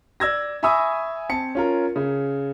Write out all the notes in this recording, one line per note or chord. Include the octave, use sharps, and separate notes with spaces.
D5 E6 G#6 A#6
E5 G#5 B5 C#6 D#6 E6
C4 A5 C#7
C#4 F4 A#4
C#3